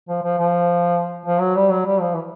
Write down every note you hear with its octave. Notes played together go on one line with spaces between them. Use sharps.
F3
F3
F3
F3
F#3
G3
F#3
G3
F3
E3